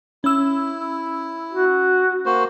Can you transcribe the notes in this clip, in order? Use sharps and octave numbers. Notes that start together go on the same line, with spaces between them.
C#4 E4 E6
F#4
A#3 F#4 C5